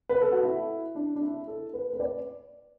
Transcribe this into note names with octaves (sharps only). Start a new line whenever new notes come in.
B4
A4
F#4
E4
D4
D4
E4
A4
B4
B4
D5